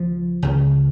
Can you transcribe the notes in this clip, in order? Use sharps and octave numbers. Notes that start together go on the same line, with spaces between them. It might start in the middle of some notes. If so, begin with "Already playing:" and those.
Already playing: C#2 F3
C#2 C#3